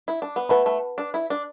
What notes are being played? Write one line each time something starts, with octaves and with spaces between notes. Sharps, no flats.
E4
D4
B3
A3 B4 F#5 B5
A3
D4
E4
D4